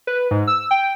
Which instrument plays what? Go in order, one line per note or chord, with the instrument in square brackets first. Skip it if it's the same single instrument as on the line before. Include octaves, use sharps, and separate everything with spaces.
[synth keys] B4
G#2
E6
G5